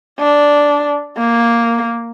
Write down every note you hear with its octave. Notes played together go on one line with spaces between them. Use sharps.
D4
A#3